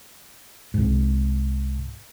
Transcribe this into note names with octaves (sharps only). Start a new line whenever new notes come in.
C2 G#2